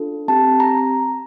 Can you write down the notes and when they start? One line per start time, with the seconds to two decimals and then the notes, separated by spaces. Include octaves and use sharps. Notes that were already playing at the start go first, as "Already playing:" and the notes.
Already playing: D4 F4 A4
0.28 C4 G4 A5
0.60 A#5